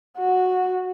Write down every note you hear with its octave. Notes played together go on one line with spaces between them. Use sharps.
F#4